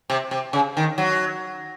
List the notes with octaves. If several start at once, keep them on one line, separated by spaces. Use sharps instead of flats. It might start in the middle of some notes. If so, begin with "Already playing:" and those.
C3
C3
C#3
D#3
F#3